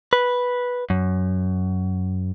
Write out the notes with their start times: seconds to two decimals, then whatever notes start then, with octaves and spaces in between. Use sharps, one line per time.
0.13 B4
0.90 F#2